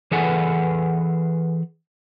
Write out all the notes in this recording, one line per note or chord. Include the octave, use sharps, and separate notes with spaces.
E3 G#4 A4 B4 F#5 G#5